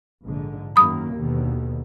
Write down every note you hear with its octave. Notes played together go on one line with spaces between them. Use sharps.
A#1 G#2 D3
F#2 D#3 A#3 B5 D#6
D#2 B2 D3